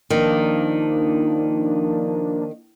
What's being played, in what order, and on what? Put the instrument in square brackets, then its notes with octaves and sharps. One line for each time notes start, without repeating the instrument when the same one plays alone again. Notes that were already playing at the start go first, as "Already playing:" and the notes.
[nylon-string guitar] D#3 [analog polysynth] F3 A#3 D4